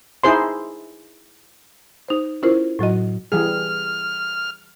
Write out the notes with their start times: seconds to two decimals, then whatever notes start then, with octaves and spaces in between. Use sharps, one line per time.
0.24 D#4 E4 G#4 C5 C6
2.08 D#4 C5
2.43 C#4 E4 F4 A#4 C5
2.79 A2 F#3 F#4 D#5
3.32 E3 G3 G#4 F6